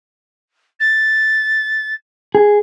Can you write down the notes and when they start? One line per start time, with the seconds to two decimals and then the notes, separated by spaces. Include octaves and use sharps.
0.80 A6
2.35 G#4